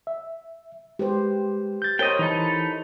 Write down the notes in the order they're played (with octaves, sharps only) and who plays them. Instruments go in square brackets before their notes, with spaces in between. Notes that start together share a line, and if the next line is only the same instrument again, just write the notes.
[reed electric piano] E5
[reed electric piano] G#3 [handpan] G4 B4 C5
[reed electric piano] G6 A6
[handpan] A#4 C5 C#5 [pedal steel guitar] D#5 G5
[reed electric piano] E3 [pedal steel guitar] D#4 E4 A4